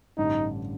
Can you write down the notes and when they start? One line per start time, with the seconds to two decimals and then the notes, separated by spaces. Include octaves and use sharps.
0.18 A1 G2 D3 D#4